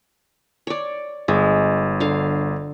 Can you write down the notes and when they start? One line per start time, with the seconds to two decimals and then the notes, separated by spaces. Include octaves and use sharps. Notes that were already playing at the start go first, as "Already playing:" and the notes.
0.67 C#5 D5
1.28 G1 G#3
2.00 D3 F5